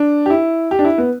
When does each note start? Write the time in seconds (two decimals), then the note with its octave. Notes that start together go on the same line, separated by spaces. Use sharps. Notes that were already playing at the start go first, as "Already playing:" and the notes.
Already playing: D4
0.26 G4
0.30 E4
0.71 G4
0.79 D4
0.85 E4
0.98 B3